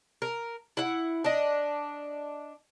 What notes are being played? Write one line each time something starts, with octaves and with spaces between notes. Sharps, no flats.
A#4
E4 F#5
D4 D#5